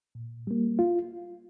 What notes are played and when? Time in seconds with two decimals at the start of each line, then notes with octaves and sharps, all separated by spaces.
0.15 A#2
0.47 G3 A#3
0.79 F4